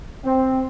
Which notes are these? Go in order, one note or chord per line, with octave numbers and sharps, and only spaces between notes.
C4